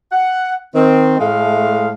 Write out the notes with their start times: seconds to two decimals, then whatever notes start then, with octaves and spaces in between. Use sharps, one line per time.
0.12 F#5
0.75 D#3 C4
1.19 A2 G#3 A3 F5